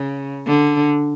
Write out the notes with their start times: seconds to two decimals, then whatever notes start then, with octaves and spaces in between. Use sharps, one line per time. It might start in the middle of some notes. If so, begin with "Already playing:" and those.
Already playing: C#3
0.47 D3